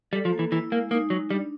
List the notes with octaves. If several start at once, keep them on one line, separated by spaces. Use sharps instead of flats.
G3 A4
F3
A#3
E3
E3 E4
G#3 A#3
A#3 D#4
F#3 D#4
G3 D4